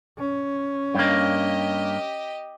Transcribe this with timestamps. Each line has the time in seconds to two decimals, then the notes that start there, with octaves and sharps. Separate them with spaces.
0.18 C#4
0.95 G2 A#3 G4 D#5